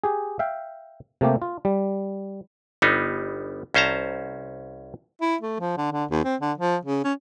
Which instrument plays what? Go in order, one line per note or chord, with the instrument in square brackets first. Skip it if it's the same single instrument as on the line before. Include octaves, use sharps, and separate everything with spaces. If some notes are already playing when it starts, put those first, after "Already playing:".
[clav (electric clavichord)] G4 G#4
E5 F5 G5
C3 A3 A#3 G4
F4
G3
G1 G3 B3 D#4
C2 C#4 C5 A5 A#5
[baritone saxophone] E4
A3
F3
D3
D3
D#2
C4
D3
F3
C#3
C#4